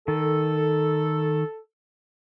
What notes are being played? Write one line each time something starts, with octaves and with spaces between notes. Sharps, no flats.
D#3 A4